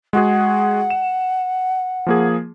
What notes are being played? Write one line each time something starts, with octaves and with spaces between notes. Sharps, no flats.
G#3 F#4 G#4 F#5
E7
F3 A#3 G#4